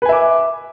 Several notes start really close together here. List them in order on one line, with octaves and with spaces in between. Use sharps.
B4 G#5 E5 D6